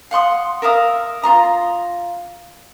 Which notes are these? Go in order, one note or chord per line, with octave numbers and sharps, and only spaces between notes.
F5 F#5 C6 D#6
A#4 E5 F5 D#6
F4 A#4 A#5 D#6